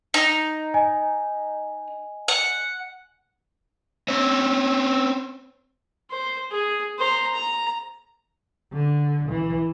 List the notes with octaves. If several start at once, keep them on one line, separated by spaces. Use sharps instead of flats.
D#4
D#5 G#5
F#5
C4 C#4
C5
G#4
C5 A#5
A#5
D3
E3